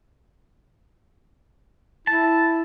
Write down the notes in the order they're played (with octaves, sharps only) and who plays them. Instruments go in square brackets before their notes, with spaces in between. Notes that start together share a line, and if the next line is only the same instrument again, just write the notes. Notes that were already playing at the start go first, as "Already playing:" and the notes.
[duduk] E4 [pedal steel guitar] A5